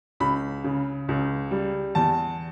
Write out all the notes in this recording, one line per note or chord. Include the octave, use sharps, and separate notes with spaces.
C#2 B5
C#3
C#2
G3
E2 A5